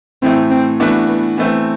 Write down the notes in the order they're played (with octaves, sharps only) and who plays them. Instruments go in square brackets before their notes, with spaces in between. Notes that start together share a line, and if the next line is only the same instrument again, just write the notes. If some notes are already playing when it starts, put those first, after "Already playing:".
[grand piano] A2 E3 A3 [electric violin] C4
[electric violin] C4
[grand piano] E3 A3 D4 F#4 [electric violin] B3
[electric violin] B3
[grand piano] E3 A3 C4 [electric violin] B3